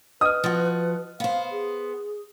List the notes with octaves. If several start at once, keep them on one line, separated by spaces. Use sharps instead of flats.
B4 D#5 D#6 F6
F3 F#4
B3 C5 F5
G#4